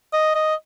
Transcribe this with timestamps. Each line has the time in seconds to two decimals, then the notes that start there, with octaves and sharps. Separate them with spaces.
0.13 D#5
0.35 D#5